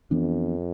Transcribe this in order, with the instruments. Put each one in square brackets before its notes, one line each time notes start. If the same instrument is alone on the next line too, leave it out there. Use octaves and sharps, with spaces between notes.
[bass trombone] F2 [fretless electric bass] E3 B3 D4